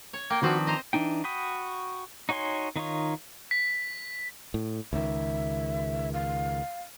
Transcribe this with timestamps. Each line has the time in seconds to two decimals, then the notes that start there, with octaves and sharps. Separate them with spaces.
0.13 C#5
0.30 A#3 G5
0.43 D#3 F3 C4 D4 F#4 B4 C5
0.67 C5 D#5 A#5
0.93 E3 D4 D#4 G5
1.24 F#4 G5 B5 D#6
2.29 D#4 F#4 C#5 G#5 C6
2.76 D#3 D#4 F4 C#5
3.51 B6
4.54 A2
4.93 C#2 D#3 E5
6.13 F5